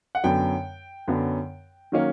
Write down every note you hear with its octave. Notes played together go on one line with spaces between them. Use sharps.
F#5
F#2 D3 F#3 B3 G5
F#2 D3 F#3 B3
D#3 F#3 A#3 C#4